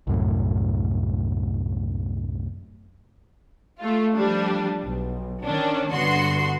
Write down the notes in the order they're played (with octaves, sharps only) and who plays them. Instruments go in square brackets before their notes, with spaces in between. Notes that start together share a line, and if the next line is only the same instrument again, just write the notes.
[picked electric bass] C2 F#2 A2
[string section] A3 F4
F3 G3 D4
B1
D#3 C#4 D4
G2 D3 B3 F#4 C6